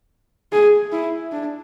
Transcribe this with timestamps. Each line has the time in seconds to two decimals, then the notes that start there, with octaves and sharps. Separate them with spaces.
0.53 G#4
0.93 E4
1.32 D4